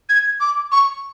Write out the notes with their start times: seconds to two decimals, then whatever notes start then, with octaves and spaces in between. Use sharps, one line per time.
0.09 G#6
0.41 D6
0.72 C#6